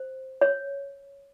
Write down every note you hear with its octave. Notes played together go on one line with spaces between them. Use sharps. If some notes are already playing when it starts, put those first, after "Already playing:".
Already playing: C5
C#5